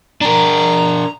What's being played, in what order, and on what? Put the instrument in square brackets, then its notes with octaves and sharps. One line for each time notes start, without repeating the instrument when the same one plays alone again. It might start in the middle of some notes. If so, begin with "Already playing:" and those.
[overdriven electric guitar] D4 A#4 [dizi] A#5